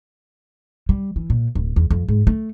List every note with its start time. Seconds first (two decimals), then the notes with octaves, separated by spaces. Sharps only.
0.89 G3
1.16 E3
1.30 A#2
1.55 D1
1.76 E2
1.91 F2
2.08 G#2
2.27 A3